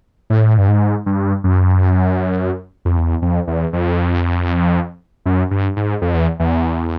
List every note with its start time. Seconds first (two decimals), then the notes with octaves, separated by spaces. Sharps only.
0.30 A2
0.58 G2
0.68 G#2
1.06 G2
1.44 F#2
2.85 F2
2.97 E2
3.22 F2
3.47 E2
3.73 F2
5.26 F#2
5.51 G2
5.76 G#2
6.02 F2
6.14 E2
6.40 E2